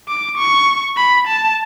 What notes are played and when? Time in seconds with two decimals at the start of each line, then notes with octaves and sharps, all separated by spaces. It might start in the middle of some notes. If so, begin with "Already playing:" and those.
0.09 D6
0.37 C#6
0.97 B5
1.28 A5